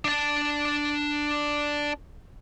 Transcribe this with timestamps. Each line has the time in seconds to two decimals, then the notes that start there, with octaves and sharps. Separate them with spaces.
0.05 D4 A5